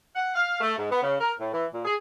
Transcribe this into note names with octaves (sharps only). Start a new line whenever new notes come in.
F#5
F5
A3
G#2
B3
C#3
A#4
A2
E3
A#2
G#4